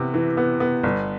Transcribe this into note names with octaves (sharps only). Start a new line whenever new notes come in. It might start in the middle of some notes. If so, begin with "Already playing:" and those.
Already playing: C3 E3 B3
E3
B3
B3
G1